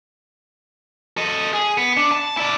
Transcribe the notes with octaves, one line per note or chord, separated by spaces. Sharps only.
A4 D#5
G#4
B3
D4
A5
E4 D5